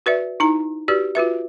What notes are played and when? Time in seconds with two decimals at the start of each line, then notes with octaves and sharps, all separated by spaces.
0.06 F#4 B4 D5 E5
0.40 D#4 E4 A#5
0.88 F#4 G4 B4 D5
1.15 F4 F#4 B4 E5